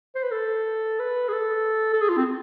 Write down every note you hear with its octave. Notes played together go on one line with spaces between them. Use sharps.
C5
B4
A4
B4
G#4
A4
A4
G#4
F4
C4